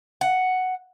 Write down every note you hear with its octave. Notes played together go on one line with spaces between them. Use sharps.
F#5